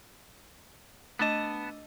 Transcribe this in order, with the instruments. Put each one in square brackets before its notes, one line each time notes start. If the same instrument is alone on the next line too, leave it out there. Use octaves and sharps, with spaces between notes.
[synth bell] A3 D4 D#5 [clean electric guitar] B3 A5